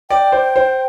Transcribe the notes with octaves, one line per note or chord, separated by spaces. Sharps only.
D5 G5
C5
C5